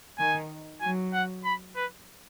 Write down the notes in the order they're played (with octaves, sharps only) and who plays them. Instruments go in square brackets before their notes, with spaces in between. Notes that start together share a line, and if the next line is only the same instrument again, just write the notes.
[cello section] D#3 [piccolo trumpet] G#5
[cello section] F#3 [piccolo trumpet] G#5
[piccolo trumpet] F#5
B5
B4